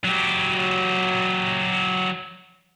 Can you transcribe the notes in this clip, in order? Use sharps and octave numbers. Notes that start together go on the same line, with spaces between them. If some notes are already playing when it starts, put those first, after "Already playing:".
F#3 G4